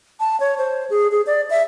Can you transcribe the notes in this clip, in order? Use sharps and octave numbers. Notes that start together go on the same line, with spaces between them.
A5
C#5
C5
G#4
G#4
D5
E5